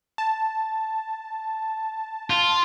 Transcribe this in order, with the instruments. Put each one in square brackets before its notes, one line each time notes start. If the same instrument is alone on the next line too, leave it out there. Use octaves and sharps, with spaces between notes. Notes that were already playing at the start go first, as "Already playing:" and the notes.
[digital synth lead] A5
[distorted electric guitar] F4